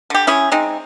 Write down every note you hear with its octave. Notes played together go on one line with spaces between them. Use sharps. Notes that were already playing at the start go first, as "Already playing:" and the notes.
D3 G4
C#4 E4 G#4
G#3 C4 D#4